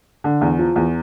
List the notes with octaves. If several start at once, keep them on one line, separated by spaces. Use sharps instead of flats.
D3
E2
F3
E2